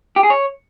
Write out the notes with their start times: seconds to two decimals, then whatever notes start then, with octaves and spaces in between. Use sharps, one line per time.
0.16 G4
0.23 G#4
0.30 C#5